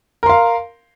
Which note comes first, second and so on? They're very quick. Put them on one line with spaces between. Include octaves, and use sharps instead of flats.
A#4 C6 F5